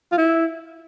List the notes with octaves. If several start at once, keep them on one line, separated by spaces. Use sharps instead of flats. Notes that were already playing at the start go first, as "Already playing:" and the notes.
F4
E4